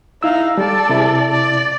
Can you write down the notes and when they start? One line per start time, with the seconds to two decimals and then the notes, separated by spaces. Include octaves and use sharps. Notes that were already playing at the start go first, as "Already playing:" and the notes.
0.23 D#4 E4 F5 E6
0.57 G3 A4 D5
0.89 C3 E4
1.31 D5